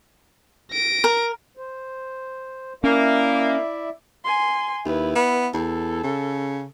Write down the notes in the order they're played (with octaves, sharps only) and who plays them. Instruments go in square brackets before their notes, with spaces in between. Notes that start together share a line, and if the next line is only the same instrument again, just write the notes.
[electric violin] A#6 D7
[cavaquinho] A#4
[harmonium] C5
[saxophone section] A#3 [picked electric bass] C#4 [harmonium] E4 D5 E5
[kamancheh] G#5 C6
[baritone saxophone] D#2 [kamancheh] E4 B4
[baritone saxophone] B3
[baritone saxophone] E2 [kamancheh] A4
[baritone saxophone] C#3